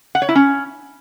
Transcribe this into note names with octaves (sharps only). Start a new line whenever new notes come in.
F#5
C#5
E4
C#4